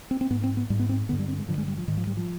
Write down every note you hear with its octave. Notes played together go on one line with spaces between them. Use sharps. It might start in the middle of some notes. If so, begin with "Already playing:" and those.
C4
C4
G#2 B3
C4
B3
G#2 G3
B3
C4
G2 D3 B3
G3
C4
G#3
G2 D3 F3
G#3
G3
F3
G#2 D#3
F3
G3
F3